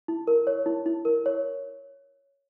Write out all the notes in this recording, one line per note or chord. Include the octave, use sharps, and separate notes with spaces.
E4
A#4
C#5
E4
E4
A#4
C#5